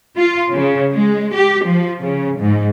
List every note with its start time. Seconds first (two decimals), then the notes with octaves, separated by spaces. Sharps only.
0.17 F4
0.53 C#3
0.91 G#3
1.33 G4
1.65 F3
2.00 C#3
2.38 G#2